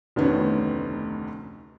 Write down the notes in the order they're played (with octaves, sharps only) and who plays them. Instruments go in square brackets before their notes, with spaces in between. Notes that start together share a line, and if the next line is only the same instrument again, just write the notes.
[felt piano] F1 D2 D#3 B3 C#4